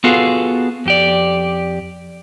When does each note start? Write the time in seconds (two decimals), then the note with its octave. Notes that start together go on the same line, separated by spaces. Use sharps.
0.04 B3 F4 F#4 G#4 A4 F5
0.86 F2 G4 D5